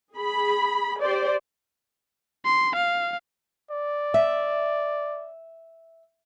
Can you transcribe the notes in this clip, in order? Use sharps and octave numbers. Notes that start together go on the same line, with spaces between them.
G#4 B5
G4 C5 D5
C6
F5
D5
E5